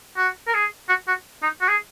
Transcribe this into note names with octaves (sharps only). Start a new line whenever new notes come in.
F#4
A#4
G#4
F#4
F#4
D#4
F#4
G#4